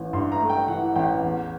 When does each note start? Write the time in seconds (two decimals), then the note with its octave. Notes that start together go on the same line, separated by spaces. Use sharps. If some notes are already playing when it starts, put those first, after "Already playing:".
Already playing: A1 E3
0.13 G2 C6
0.32 A#5
0.40 A3
0.50 G5
0.68 E3 F#5
0.96 A1 G5
1.23 E2